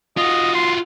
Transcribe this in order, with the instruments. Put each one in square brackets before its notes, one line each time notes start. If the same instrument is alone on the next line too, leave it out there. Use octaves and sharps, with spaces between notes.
[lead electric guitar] F4 F#4 [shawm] D#5
[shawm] C6